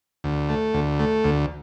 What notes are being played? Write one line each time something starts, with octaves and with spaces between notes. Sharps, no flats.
D2
A3
D2
A3
D2